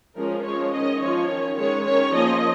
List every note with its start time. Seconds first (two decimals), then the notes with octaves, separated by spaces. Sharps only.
0.16 F3 G#3 C#4 A#4
0.44 F3 G#3 C#4 C#5
0.73 D#3 C#4 D#5
1.01 F3 C#5
1.06 C#4
1.30 D#3 C#4
1.57 D#3 G#3 C#4 C#5
1.86 D#3 C#4 C#5
2.14 F3 A#3 C#4 D#5